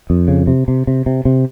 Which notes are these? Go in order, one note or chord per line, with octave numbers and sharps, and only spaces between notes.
F2
C#3
C3
C3
C3
C3
C3